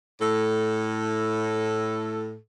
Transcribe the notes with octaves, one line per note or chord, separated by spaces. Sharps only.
A2 A4